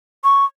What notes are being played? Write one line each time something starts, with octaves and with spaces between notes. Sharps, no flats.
C#6